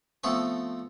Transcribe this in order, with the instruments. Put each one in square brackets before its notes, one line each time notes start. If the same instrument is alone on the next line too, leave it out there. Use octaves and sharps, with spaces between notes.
[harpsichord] F3 A3 B3 C4 A4 C#6